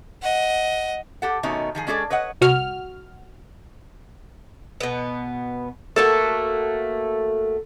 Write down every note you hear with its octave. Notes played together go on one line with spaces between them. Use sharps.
D#5 F#5
G4 A4 F#5
B2 D#3 A3 C#4 D#4
D#3 F3 G#4
G#3 C#4 G#4 A4 D5
B4 C#5 D#5 F#5
C2 F#4 F6
B2 B3
A3 A#3 F#4 A4